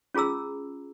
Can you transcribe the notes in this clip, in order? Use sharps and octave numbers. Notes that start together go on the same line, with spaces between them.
C#4 F4 G#4 A#5 E6